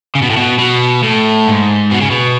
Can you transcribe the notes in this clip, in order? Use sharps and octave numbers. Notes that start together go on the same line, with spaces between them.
C#3
B2
A2
B2
B2
A2
G#2
B2
C#3
B2